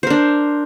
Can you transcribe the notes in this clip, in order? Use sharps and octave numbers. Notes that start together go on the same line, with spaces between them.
D4 A#4 C5